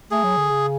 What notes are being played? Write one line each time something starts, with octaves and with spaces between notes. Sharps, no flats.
A3 G#4
F#3
D3
C#3